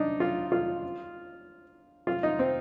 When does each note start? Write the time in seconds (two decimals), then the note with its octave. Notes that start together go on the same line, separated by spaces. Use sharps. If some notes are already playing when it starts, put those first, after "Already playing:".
Already playing: D4 D#4
0.20 F4
0.52 F4
2.07 F4
2.23 D#4
2.39 C4